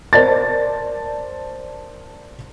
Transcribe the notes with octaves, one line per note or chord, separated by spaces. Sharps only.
A#4 C5 D5 A5 A6